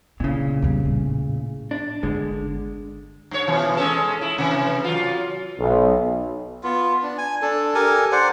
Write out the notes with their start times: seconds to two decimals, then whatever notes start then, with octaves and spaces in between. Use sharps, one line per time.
0.20 A#2 C#3 E4
0.62 E2 G2
0.85 A2
1.71 D4
2.03 G1 D3 G#3
3.31 G2 C#5
3.47 B2 E3 F3
3.77 G#3 C#4 A4
4.21 E4
4.37 A2 C3 E3
4.84 F#3 F4
5.59 B1
6.63 B3 F4
7.03 D4
7.18 G#5
7.42 D4 A4
7.75 G4 A4 A#4 G#5
8.12 C5 D5 F#5